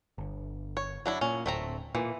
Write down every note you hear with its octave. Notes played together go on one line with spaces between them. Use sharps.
G1
C#5
F#3 D4 E4
A#2 C#4
D1 A3 C4 A#5
A#2 E3